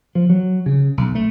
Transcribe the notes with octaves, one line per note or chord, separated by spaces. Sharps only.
F3
F#3
C#3
B1
A3